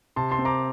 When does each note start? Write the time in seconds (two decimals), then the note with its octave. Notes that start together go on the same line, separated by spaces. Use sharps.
0.16 C3 A5 C6
0.31 A5 C6
0.39 C4
0.45 A#5 D6